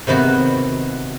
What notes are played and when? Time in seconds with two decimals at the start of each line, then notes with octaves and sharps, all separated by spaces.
0.07 C3 D#3 B3 F#4